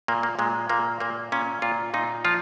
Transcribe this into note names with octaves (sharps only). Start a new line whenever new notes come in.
A#2 A#3
A#3
A#2 G#3
A#2 A#3
A#2 A#3
A#2 C#4
A#2 F4
A#2 D#4
F3 F4